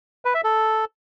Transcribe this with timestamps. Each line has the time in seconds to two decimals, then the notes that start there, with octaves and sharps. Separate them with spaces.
0.25 B4
0.34 E5
0.44 A4